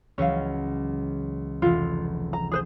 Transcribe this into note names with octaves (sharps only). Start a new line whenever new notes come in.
C#2 E3 F#3 C#4 F5
F1 E3 F4
A#5
G#4 B4 C5